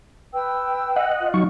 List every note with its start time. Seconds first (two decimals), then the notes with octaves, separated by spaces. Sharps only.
0.33 B4 G5 E6
0.96 D#5 F#5
1.21 F4
1.34 F#3 D#4 C#6